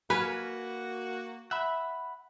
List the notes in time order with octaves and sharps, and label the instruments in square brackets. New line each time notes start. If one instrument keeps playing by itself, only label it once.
[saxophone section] A#3 F#4 [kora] B4 [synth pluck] G#5 F6 F#6
[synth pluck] E5 [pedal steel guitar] F#5 B5